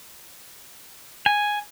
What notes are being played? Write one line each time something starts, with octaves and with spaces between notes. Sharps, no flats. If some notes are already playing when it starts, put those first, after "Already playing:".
G#5